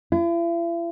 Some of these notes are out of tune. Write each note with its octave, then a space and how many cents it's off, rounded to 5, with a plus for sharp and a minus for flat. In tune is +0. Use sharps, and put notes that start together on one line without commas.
E4 +45